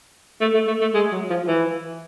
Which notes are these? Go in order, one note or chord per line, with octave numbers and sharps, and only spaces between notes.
A3
A3
A3
A3
G#3
F#3
F3
E3